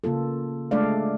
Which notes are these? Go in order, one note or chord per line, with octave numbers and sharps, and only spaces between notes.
C#3 A#3 F4 A4
G#3 A3 D4 A4 D5 F5